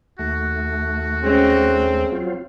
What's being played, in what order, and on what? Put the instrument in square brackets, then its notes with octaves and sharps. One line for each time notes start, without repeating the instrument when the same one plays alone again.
[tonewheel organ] D#2 A3 [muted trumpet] F#4
[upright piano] G#3 C#4 [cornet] C4
[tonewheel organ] F#3 C4 F4